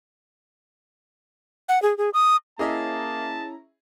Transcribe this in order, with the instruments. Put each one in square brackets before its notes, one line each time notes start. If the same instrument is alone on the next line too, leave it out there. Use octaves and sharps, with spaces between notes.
[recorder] F#5
G#4
G#4
D#6
[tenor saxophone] A#3 [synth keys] C#4 E4 A#5 [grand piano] G#4 D#5 E5 [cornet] A5